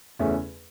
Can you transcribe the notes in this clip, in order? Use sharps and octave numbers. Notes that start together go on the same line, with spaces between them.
E2 C#3 E3 A3 C#4 E5